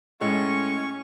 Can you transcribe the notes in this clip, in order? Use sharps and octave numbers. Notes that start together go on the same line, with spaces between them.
A2 G#3 C#4 C#6